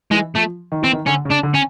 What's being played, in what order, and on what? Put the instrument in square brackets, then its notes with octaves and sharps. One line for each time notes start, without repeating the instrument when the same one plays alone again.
[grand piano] E3 [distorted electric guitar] G#3
[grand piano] F3 [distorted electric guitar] A3
[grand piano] D#3
[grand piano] E3 [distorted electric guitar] C4
[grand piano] D#3
[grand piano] D3 [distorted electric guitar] C#4
[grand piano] C#3
[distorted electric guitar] D4
[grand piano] D3
[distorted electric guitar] C#4